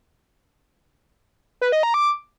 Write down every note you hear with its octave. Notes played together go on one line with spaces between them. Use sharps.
B4
D#5
A#5
D6